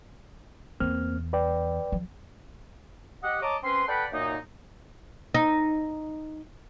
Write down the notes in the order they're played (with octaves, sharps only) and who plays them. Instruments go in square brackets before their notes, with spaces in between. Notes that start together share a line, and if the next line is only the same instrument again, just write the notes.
[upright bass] E2 [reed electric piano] A#3 C4 F6
[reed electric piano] B4 D5 G5
[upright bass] F3
[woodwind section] G4 D#5 F#5
C#5 D#5 A5 A#5 D6
C4 C#4 B4 C6
A4 B4 D5 F#5 G5 B5
F#2 A#2 A#3 D#4
[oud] D#4